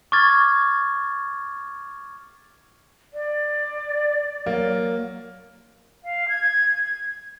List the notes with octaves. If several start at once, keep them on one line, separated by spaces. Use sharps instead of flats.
C#6 D6 F6 G#6 A6
D5
F#3 A#3
F5
G#6